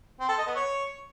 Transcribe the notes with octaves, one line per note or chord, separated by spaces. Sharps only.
C4
A4
D#5
B3
C#5